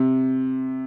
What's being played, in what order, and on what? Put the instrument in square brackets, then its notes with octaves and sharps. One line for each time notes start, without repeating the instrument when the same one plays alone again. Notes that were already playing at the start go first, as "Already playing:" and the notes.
Already playing: [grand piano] C3